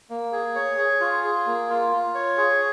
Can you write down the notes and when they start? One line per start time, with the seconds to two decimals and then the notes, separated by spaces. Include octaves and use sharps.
0.10 A#3
0.32 G#4
0.55 C#5
0.78 G#4
1.01 F4
1.24 G#4
1.46 A#3
1.70 F4
1.92 F4
2.14 C#5
2.37 G#4